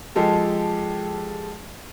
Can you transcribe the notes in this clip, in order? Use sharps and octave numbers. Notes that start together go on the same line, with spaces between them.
F3 G#3 G4 A4